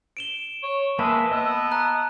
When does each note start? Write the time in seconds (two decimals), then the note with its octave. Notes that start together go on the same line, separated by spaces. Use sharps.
0.17 D7 E7 G7
0.63 C#5
0.99 G#3 A#3 B4 E5 A5
1.31 B3 D#5 E6
1.72 A#5 F#6